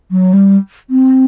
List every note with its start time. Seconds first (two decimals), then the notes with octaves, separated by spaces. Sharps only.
0.11 F#3
0.33 G3
0.90 C4